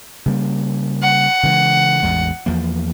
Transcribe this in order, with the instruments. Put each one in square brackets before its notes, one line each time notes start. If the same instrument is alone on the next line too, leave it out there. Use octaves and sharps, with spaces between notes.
[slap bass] C#3 G3 A#3
[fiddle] F#5
[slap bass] C#3 E3 G#3
A1 E2 G#3
E2 F3 A#3